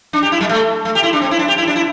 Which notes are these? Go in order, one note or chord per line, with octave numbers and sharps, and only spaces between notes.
D4
G4
E4
G3
A3
A3
G4
E4
D4
C4
E4
D4
G4
E4
D4
E4